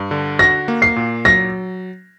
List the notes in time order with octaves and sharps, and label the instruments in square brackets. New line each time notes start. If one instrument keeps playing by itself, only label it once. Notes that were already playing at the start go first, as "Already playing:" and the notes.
Already playing: [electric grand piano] G2
D3
[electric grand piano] F#4 [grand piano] A#6
[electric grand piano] A#3
[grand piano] C7
[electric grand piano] A#2
[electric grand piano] F#3 [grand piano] A#6